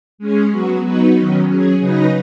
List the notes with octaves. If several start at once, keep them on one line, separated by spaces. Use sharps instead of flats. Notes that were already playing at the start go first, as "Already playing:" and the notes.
G#3 C#4 G#4
F#3 B3 F#4
F#3 B3 D#4 F#4 B4
D#3 F#3 C#4
F#3 C#4 G#4
C#3 F#3 D#4 B4 D#5